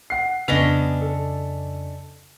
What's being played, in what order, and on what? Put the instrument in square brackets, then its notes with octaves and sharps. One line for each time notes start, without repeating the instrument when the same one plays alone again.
[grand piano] F#5 C7
[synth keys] F2 C#3 [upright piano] B3 [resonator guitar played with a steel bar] C#4 D4 D#5 [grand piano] B6 F7
[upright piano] A4